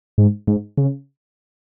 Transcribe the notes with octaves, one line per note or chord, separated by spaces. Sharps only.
G#2
G#2
C#3